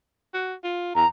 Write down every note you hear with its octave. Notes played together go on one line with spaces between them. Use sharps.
F#4
F4
E2 A#5